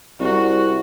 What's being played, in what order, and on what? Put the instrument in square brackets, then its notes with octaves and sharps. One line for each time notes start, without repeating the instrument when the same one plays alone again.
[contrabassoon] C2 [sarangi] F#4